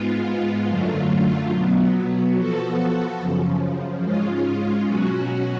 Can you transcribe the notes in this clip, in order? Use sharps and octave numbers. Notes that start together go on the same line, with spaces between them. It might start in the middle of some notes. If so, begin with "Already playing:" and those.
Already playing: G#2 G#3 B3 F4
F#2 D3 F#3 A3 F4
B2 F#3 B3
F3 B3 F#4 A4
F#2 C#3 F3
G#2 G#3 C#4 F4
B2 F#3 C#4 F#4